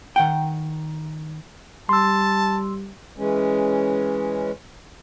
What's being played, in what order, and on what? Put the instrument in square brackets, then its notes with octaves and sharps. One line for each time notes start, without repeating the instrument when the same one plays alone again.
[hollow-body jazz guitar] D#3 F#5 G5
[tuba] G3 [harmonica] A5 [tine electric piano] C6 E6
[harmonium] E3 G#3 C#4